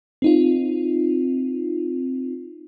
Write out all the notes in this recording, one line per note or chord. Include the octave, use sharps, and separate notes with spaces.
C4 D#4 F4